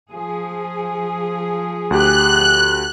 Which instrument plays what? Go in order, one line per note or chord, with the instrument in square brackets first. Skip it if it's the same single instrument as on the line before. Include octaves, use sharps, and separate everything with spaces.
[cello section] F3 G#4
[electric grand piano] D2 G4 [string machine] F#6